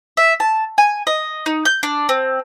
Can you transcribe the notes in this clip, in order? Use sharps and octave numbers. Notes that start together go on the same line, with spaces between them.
E5
A5
G#5
D#5
D#4
G6
D4
C4